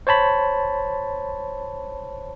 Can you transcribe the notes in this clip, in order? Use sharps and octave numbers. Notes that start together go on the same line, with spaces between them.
C5 C#5 A5 B5